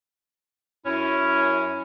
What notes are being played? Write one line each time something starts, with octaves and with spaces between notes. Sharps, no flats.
F#2 C#4 E4